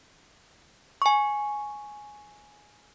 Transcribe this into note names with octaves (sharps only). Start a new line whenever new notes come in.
G#5 C#6